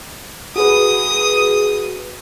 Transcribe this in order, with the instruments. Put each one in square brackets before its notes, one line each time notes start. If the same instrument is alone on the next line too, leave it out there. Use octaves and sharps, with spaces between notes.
[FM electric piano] F#4 G#4 B4 [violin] D#6